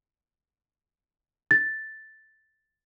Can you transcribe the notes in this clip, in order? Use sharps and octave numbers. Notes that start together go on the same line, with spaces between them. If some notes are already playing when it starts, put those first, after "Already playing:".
A6